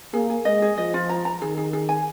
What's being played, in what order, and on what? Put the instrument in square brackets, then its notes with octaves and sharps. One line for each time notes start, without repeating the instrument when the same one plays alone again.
[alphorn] A#3 [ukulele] G#4
[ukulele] G#4
[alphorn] G#3 [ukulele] D#5
[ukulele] G#4
[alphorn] F3 [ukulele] D#5
[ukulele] F4
A#5
A#5
[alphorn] D#3 [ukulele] G#4
[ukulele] G#4
G#4
G#5